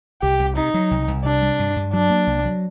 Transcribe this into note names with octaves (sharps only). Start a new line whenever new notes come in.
C2 G4
C2
C3 D#4
F#3
C2
C2
C3 D4
G3
G2
G2
F#3 D4
A#3
C2
F#3